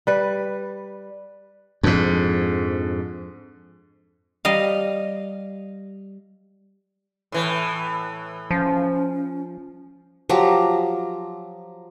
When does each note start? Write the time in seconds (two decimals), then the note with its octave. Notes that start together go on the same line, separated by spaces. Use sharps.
0.07 G3 B4
1.83 F2 G#2 F3 D4
4.45 G3 D#5 F5
7.32 A2 E3
8.51 F3 C#4
10.29 F3 F#3 G4 A#5